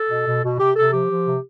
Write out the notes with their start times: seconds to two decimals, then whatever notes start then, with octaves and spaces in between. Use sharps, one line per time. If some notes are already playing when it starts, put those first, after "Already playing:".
Already playing: A4
0.10 B2
0.27 B2
0.43 B2
0.59 C3 G4
0.76 C3 A4
0.92 F3 G4
1.10 F3
1.26 C3